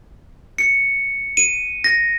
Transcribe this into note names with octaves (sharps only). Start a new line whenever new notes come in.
C#7
D#7
A#6